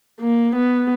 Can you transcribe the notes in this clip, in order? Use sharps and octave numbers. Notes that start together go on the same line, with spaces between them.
A#3
B3